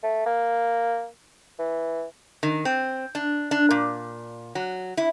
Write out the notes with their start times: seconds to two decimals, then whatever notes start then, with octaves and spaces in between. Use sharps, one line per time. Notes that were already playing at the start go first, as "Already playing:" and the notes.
0.03 A3
0.26 A#3
1.59 E3
2.43 D#3
2.65 C4
3.15 D4
3.51 D4
3.71 A#2
4.55 F#3
4.97 E4